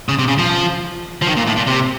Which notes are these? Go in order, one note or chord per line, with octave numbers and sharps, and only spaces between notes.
C#3
C3
C#3
F3
F3
D#3
A#2
A2
A#2
C3